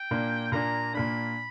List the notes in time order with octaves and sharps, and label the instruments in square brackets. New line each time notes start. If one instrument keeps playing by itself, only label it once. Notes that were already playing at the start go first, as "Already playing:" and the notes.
Already playing: [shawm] G5
[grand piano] A#2 A#3 D4
[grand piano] A#2 A#3 D4 [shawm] A#5
[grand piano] A#2 A#3 D4 [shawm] B5